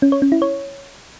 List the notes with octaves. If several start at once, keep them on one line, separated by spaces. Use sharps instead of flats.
C#4
C#5
C#4
E4
C#5